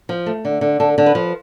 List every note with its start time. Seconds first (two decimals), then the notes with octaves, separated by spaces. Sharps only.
0.09 F3
0.26 A3
0.45 D3
0.61 D3
0.80 D3 A4
0.98 D3
1.06 B4
1.15 F3